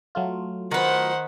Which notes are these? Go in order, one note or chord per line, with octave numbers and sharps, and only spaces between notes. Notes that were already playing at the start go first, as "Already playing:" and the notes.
F#3 A3 F4
D#3 B4 C5 F#5